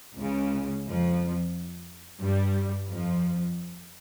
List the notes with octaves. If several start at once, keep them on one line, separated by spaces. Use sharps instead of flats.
C#2 C#3
F2 F3
G2 G3
F2 F3